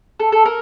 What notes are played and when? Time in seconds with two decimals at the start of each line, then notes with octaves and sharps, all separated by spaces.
0.20 A4
0.32 A4
0.45 A#4